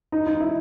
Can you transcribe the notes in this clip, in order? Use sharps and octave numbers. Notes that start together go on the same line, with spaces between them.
D#4
D#4
E4